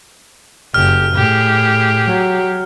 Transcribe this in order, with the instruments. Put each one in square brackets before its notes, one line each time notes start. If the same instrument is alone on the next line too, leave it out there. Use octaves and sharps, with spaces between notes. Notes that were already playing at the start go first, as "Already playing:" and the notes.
[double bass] F#1 [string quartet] G4 [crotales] F6
[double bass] A2 [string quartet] G4 G#4
[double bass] F#3